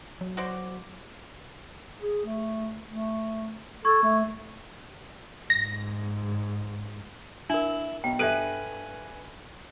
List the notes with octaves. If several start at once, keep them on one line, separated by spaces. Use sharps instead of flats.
F#3
F#4 C5 D5
G#4
A3
A3
A4 C#6 G#6
A3
G#2 A#6
D4 E4 A#4
B1 G5
G2 A4 B4 E5 G#5 F#6 D#7